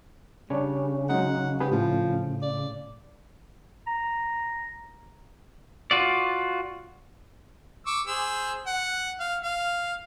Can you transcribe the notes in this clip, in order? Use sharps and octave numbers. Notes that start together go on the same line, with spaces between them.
C#3 G3 D4 C#5
F#3 G#3 D#4 F#5
C4 G4 G#4 B4
A2 F3
D5
A#5
F4 F#4 D5
C#6 D6 E6
G#4 C5 E6
F#5
F5
F5